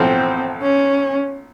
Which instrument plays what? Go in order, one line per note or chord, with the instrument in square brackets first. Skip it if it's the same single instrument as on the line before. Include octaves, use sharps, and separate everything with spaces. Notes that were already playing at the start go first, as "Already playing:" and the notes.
Already playing: [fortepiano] B1 A2 F3 [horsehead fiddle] C4
[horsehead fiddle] C#4